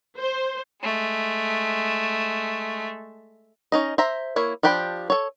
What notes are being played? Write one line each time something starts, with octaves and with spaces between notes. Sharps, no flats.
C5
G#3 A3
C#4 D#4 D#5
C5 E5 A#5
A#3 E4 C#5
F3 D4 G4 G5 B5
A4 C#5